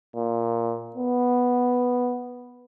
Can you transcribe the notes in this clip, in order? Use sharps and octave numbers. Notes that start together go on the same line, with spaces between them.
A#2
B3